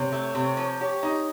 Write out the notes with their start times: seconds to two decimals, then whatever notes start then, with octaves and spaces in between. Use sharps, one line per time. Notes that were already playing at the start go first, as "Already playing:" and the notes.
Already playing: C3 C#5
0.12 A3
0.35 C3
0.57 F3
0.80 G4 C#5
1.03 D#4